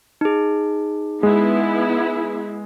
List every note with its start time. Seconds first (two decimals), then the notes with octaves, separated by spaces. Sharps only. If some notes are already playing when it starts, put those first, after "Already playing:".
0.21 D#4 G#4
1.23 G#3 B3 E4